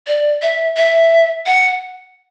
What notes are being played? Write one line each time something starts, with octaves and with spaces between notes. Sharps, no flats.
D5
E5
E5
F#5